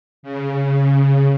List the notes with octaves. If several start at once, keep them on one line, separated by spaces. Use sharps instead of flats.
C#3